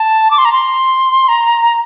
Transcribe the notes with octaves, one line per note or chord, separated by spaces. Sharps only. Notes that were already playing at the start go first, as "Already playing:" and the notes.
Already playing: A5
D6
C6
A#5
C6
A#5